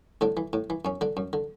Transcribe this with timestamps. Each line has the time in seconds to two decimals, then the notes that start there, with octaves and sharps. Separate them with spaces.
0.21 A2 D3 D4
0.37 E3
0.53 A2
0.70 E3
0.85 F#2 C#4
1.01 D3 D4
1.17 F#2
1.33 D3